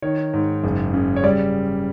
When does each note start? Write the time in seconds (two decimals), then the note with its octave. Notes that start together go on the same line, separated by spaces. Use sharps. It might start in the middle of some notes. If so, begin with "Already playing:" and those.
0.02 D#3 C#5
0.33 G#2
0.64 F#1
0.94 C#3
1.16 C#5
1.24 G3 D5